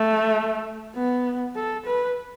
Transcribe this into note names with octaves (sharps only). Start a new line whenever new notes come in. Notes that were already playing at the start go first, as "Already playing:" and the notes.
Already playing: A3
B3
A4
B4